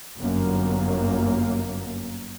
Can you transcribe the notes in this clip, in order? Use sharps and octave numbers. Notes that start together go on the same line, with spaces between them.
G1 F#2 A#3